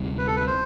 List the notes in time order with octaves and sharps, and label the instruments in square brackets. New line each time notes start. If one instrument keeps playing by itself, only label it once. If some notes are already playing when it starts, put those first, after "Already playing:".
Already playing: [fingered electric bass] D2 C3 G3
[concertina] B4
A4
B4
C5